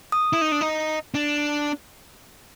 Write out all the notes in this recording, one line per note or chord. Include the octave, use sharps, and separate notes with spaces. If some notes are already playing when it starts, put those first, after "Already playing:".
D#6
E4
D#4
D4
D#4
D4